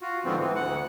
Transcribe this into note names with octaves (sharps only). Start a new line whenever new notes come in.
F4 F#4
G#2 D3 F3 B3 C4
E3
D2 F#5